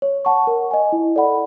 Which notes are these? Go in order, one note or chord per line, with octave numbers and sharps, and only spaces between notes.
C#5
F#5 A5 C#6
A#4
D#5 G#5
E4
A4 D5 F#5 B5